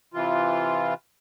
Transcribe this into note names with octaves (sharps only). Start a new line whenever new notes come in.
C3 E3 F4